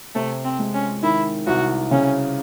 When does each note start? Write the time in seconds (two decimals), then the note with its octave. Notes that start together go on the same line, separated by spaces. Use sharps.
0.15 C3 A3
0.44 C4
0.59 G#3
0.74 C#4
1.03 D#3 E4
1.47 C2 F#4
1.91 C#3 C#4